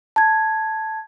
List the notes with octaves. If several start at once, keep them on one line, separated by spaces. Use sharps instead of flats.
A5 G#6